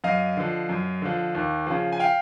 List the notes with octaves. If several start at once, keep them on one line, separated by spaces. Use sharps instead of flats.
F#2 D#5 F5
D3 F3
F#2
D3 F3
D#2
C#3 F3
G#5
F5 G5